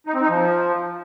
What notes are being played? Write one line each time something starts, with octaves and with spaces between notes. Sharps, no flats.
D#4
C4
D#4
F3